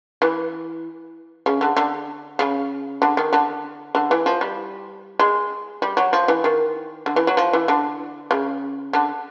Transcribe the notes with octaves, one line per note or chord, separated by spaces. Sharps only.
E3
C#3
D3
D3
C#3
D3
D#3
D3
D3
E3
F3
G3
G#3
G3
F#3
F3
E3
D#3
D3
E3
F#3
F3
E3
D3
C#3
D3